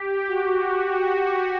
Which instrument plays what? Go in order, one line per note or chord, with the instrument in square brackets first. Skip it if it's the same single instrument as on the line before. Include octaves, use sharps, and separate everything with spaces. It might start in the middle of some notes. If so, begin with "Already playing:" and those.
Already playing: [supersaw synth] G4
F#4
F#4